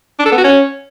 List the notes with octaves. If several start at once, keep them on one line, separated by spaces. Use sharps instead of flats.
D4
A4
B3
F#4
C#4